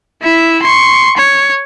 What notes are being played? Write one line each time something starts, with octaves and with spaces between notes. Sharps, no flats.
E4 E5
C6 C#6
C#5